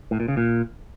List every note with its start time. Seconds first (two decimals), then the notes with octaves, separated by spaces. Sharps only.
0.11 A2
0.20 A#2
0.28 C#3
0.37 A#2